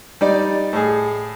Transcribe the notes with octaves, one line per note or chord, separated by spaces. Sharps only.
G3 D#4 D5
A2 G#4